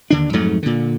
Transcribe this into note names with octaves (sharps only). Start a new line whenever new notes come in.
D#2 D3 D4
F2 G#2 F#3 A3
A#2 D3